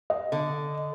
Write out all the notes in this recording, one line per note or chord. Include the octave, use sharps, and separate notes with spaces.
D#5
D3